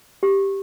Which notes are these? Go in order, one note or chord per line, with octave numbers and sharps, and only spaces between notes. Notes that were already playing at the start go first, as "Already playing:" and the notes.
G4